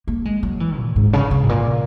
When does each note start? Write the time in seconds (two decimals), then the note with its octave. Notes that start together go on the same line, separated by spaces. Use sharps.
0.08 A#3
0.25 G#3
0.43 F#3
0.60 E3
0.78 A#2
0.96 G#2
1.13 C#3
1.31 C#3
1.43 G#2
1.49 A#2